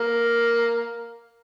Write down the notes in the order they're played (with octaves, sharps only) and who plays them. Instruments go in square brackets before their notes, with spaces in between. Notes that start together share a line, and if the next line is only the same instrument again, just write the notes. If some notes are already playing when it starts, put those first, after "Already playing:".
Already playing: [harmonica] A#3